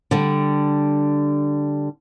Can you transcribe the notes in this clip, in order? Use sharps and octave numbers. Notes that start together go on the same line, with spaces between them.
D3 G3